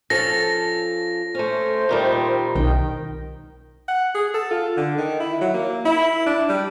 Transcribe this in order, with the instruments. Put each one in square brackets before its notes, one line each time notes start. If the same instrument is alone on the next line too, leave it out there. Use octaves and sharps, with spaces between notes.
[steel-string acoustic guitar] F3 C#4 A4 [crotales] A#6
[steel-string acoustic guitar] A3 C#4 [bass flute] C5
[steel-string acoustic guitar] A#2 D#3 G3
[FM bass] B1 [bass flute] D#3 [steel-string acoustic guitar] G5
[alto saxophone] F#5
G#4
A4
F4
D3
D#3
E4
F#3
A#3
E4
D4
G3